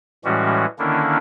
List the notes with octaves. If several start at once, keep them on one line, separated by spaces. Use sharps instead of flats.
A2 E3 G3 G#3 C#4 F#4
D3 D#3 A#3 C#4 D4 E4